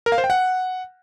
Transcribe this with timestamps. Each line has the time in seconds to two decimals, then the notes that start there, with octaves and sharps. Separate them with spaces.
0.06 A#4
0.12 F5
0.18 C5
0.24 G5
0.30 F#5